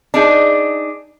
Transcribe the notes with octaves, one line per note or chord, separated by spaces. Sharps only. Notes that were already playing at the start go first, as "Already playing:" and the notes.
D4 D#4 G#4